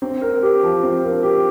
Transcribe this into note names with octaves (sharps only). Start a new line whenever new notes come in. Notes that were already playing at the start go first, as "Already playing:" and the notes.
C4
A#4
G4
F3
C4
A#4
G4